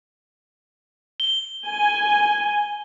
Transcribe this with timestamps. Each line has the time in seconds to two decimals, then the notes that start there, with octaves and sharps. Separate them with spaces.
1.20 G7
1.66 G#5